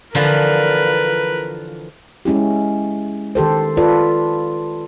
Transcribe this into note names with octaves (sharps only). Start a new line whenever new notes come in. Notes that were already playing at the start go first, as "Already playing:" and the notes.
D3 E3 F3 A#4 B4
G#3 C#4 E4 G4
D#3 G4 A4 C5
F4 A4 B4 D5